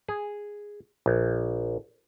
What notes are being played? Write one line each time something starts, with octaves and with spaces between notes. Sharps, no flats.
G#4
A#1